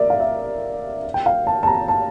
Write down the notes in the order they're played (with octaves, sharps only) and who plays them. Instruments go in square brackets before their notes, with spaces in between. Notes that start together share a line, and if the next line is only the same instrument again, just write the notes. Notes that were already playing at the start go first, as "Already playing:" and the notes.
Already playing: [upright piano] A#4 D5 E5
F5
E5
G5
F5
A5
A5
A#5
A5